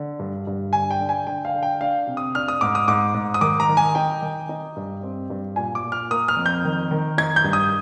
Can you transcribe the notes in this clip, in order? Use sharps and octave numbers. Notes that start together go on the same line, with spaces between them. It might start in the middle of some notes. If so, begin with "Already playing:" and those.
Already playing: D3
G2
G2
D3 G#5
G5
D3
G#5
D3 G5
F5
D3
G5
D4 F5
C3
D#6
D4 F6
D#6
G#2 D6
D#6
G#2 D6
G#2
D#6
D#3 D6
A#5
D#3
G#5
D#4 G5
D#3
D#4
G2
C4
G2
A#2 G#5
D6
A#2
F6
A#3 D#6
F6
F2
G6
D#3
D#3
D#4 G#6
G6
G2
D#6